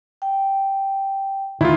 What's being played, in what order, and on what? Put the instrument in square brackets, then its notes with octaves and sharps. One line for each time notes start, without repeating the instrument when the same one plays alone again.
[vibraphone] G5
[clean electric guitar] D2 D#3 [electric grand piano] E4 F4